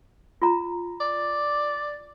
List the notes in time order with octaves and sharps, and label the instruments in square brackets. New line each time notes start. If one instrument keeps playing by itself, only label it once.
[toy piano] F4 A#5
[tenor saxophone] D5